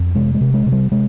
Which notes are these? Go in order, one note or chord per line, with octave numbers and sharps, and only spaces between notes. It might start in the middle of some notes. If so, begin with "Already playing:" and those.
Already playing: F2
C3 G#3
G#3
C3
G#3
C3
G3
C3 G#3